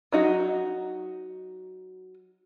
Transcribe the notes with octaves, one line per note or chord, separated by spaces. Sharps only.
F#3 D#4 F#4